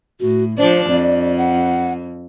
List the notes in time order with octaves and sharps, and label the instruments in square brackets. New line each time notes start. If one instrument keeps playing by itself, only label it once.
[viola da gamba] A2 [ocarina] F#4
[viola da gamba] F3 D4 D5 [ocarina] C5
[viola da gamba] F2 [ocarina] D5
[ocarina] F#5